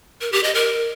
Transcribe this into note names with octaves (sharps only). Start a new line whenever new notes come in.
A#4
G4
D#5
A#4